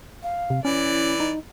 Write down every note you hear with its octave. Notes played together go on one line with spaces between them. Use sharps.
F5
C3
E3 C#4 E4 D5
D#4